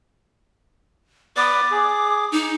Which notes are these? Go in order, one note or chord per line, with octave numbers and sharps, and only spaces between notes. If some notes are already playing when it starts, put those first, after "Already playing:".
B3 B4 D5 D6
G#4
D#4